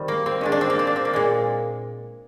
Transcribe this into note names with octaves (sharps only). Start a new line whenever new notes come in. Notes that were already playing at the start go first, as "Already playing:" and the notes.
Already playing: D#3 G3 C4
A#3
C4
D#3 G#3 D4
D4
C4
A#3
C4
D4
C4
A#3
A#2 G#3